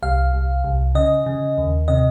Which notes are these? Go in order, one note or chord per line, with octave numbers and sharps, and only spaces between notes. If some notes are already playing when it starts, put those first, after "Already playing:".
C2 F5
C2
C2
C#3 D#5
C#3
D#2
C3 D#5